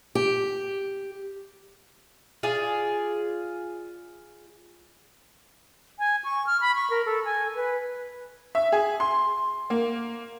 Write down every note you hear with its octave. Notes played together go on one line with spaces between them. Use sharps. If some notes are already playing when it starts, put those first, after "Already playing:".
G4
F4 G#4 D5
G#5
C#6
F6
B5
C#6
A#4
A4
G#5
B4
E5
G#4
C6
A#3